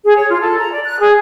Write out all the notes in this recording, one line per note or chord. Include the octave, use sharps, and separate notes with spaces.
G#4
C#5
F4
A4
A#5
D5
F#6
G#4